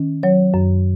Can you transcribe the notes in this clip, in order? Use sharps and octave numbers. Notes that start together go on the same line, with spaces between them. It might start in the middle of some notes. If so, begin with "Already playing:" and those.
Already playing: D#3 C#4
F#3 C#5
F#2